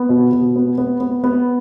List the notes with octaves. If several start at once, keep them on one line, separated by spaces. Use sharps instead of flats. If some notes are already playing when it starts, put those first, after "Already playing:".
Already playing: B3
B2
B2
B3
B3
B3
B3